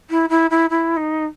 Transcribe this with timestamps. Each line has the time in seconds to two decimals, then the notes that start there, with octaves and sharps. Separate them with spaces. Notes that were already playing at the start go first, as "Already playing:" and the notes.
0.10 E4
0.29 E4
0.50 E4
0.70 E4
0.96 D#4